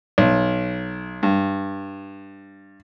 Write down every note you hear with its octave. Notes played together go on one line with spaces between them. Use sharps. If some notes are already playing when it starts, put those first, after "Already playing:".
B1
G2